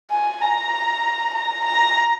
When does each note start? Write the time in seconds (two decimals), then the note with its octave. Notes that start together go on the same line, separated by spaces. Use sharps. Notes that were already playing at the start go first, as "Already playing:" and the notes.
0.11 G#5
0.42 A#5
1.34 A#5
1.65 A#5